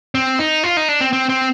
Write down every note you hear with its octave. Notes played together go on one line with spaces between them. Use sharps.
C4
D#4
F4
D#4
D4
C4
C4
C4